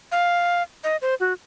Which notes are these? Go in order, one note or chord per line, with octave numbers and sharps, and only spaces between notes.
F5
D#5
C5
F#4